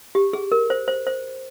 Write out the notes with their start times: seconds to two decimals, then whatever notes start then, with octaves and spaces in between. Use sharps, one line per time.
0.15 G4
0.33 G#4
0.52 A#4
0.70 C5
0.88 C5
1.07 C5